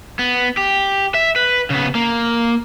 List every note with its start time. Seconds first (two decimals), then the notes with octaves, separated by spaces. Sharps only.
0.19 B3
0.57 G4
1.14 E5
1.36 B4
1.70 C#3 B3
1.95 A#3